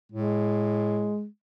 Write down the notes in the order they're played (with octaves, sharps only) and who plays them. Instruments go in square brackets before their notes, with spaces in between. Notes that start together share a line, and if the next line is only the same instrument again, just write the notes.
[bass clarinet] A2 [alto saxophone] G#3